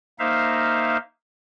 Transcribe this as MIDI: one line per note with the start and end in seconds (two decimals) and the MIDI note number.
0.19 0.97 58
0.19 0.97 63
0.19 0.97 72
0.19 0.97 76
0.19 0.97 77